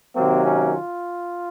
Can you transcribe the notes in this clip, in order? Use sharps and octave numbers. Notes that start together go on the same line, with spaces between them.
C3 D#3 F#3 A#3 C4
C#4
F4